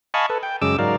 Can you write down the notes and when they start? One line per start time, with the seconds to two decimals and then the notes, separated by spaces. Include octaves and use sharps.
0.14 D#5 F5 G#5 A5 B5 C#6
0.30 A4 B4
0.43 G5
0.62 F#2 C#3 G#3 D6 E6
0.79 G#2 F#3 A#4 D5 F5